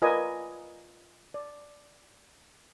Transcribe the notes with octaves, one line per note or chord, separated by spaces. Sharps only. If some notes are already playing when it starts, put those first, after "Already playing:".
F4 A#4 B4 D5 D#5 G#5
D5